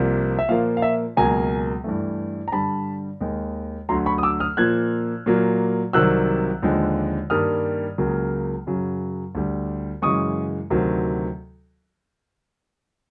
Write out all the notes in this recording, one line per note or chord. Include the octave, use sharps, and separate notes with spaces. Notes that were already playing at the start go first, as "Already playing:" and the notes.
Already playing: C2 C3 F3 A#3
E5
A#2 F3 A#3 F5
F5
E5
C#2 B2 F#3 A#3 G#5 A#5
G2 E3 A3
A#5
G2 D3 G3 A5 B5
D#2 D#3 G#3
D2 D3 F#3 A3 A#5 C6
B5 C#6
D#6
D6 E6
D#6 F6
A#2 F3 A#3 F#6 G#6
A#2 F#3 A#3
C2 C3 D#3 F#3 E6 F#6
D#2 D3 F3 G#3
G2 D#3 G3 A#3 D#6 F6
C#2 C#3 F#3 A#3
F#2 C#3 F#3
D2 D3 G3
F#2 C#3 E3 G#3 C#6 D#6
D2 C3 D#3 F#3